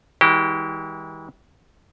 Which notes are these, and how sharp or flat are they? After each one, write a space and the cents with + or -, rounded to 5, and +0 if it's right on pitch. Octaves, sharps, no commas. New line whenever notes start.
E3 -40 G#3 -35 G4 -25